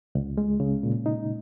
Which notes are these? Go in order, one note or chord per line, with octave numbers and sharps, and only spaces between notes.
C#2
G#3
C#3
A#2
D#4